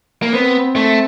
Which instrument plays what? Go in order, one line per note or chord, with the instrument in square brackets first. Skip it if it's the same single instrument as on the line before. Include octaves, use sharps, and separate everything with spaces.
[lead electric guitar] A#3
[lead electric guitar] B3 [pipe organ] C4
[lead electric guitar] A3